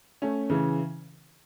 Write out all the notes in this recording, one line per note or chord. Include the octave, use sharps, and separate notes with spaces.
A3 C#4
C#3 E3